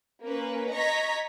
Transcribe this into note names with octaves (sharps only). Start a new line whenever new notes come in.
A#3 C#4 B4
D#5 A#5 C#6 G#6 A#6 B6